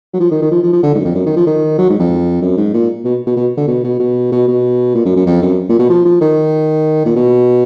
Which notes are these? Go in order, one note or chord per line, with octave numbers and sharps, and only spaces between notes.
F#3
F3
D#3
D#3
F3
F3
F3
D3
G#2
F#2
F2
F#2
D#3
F3
D#3
F#3
G#2
F2
F#2
G#2
A#2
B2
B2
B2
D3
B2
B2
B2
B2
B2
A#2
F#2
F#2
F2
F#2
A#2
B2
F3
F3
D#3
A#2
B2